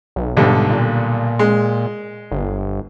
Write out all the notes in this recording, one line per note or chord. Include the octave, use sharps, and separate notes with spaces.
B1
B1 G#2 D3 G3
A#2
G#3
G1